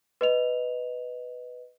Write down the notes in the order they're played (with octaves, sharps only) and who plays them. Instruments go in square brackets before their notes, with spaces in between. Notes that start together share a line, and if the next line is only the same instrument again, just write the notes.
[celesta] B4 D#5 F7